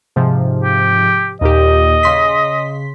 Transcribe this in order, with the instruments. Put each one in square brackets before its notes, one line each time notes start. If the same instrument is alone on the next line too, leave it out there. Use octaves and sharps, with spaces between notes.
[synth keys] G#2 C3 F3
[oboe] G4
[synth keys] D#2 A#2 G4 [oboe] D#5
[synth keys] C#3 C6 B6